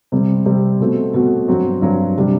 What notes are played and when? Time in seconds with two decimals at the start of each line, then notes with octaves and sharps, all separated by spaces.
0.12 C3 G3 C4
0.46 C3 G3 C4
0.80 B2 A3 C4 F#4
1.14 B2 A3 C4 F#4
1.48 G2 F#3 C4 F#4
1.82 G2 F#3 C4 F#4
2.17 C3 G3 D4